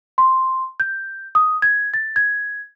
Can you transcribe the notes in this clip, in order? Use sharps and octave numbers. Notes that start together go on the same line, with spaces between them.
C6
G6
D#6
G#6
A6
G#6